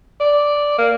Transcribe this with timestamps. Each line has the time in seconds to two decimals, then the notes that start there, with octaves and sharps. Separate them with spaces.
0.20 D5
0.78 A#3